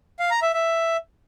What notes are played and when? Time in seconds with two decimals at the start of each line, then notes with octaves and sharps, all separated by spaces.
0.19 F5
0.31 A#5
0.42 E5
0.53 E5